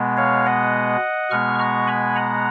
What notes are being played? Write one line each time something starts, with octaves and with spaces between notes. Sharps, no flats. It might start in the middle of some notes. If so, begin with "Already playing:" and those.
Already playing: B2 G#3 B3
C#5 F5
D#5 F#5
B2 G#3 B3 C#6 F6
A#5 C#6
G#5 B5
F#5 A#5